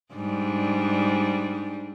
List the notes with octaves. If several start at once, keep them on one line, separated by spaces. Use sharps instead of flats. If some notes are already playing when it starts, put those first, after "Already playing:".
G#2 G3 D4